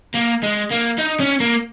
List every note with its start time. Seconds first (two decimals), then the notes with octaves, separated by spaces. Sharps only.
0.15 A#3
0.43 G#3
0.71 A#3
0.98 D#4
1.20 C#4
1.40 A#3